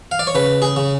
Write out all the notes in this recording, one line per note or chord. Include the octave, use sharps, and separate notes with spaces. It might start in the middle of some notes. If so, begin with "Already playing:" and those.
F5
D5
C#5
C#3 B4
G#4
C#3